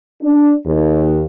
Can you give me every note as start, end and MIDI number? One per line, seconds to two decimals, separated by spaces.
0.22 0.52 62
0.66 1.22 39